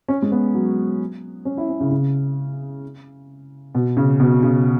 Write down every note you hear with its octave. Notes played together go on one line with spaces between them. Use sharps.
C#4
G#3
B3
F#3
C#4
E4
C#4
C#3
C#3
B2
C#3
B2
C#3